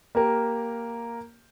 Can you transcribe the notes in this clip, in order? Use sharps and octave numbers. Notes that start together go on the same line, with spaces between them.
A#3 G4 A#4